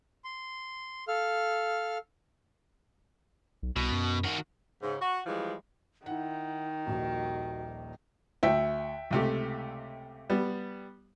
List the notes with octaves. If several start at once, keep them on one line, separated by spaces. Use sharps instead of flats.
C6
A4 F5 F6
B1
C2 B2
F#2
D#3 F#4
G#2 C#3
F#4
E3 F3 G3 G#3
D#3 D#4 E4 F#5
D#1 A#1 F#4
D2 E5 G5
C#2 C3 A3
G3 B3